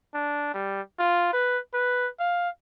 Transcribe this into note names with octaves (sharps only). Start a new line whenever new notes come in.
D4
G3
F4
B4
B4
F5